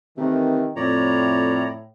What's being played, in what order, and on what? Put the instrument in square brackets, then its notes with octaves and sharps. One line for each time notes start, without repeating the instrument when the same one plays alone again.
[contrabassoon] C3 [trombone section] D#3 [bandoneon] E3 A3
[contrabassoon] F2 [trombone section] A2 [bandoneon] C#5 D5 A#5